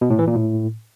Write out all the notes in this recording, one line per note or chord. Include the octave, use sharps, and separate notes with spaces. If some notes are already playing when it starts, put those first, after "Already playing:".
B2
A2
E3
A#2
A2